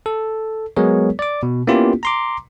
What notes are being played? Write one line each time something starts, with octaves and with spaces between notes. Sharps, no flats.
A4
F#3 G#3 B3 G#4 A#4 C#5
D5 D6
B2
A#3 B3 C#4 E4 F4 G4
A#5 C6 D6